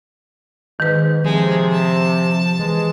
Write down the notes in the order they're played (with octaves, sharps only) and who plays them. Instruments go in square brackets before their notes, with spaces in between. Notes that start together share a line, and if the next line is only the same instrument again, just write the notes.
[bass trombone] G#2 [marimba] D#3 B4
[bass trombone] C3 [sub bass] F3 [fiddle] G#3
[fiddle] A5
[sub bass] E3 [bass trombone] G#3